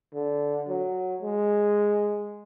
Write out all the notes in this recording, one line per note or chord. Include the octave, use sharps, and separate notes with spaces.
D3
F#3
G#3